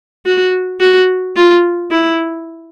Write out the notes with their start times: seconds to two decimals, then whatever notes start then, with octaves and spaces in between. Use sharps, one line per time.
0.26 F#4
0.80 F#4
1.36 F4
1.91 E4